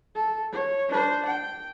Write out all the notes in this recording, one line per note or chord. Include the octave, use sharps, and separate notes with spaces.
A4
C#5
D4 C5
G5